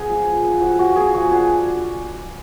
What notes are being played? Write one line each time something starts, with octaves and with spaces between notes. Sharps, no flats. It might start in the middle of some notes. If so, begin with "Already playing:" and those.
Already playing: B3 G#4
F3
F4
B3
F3 F#4
F4 F#4
B3 G#4
F3 F#4
D4 G#4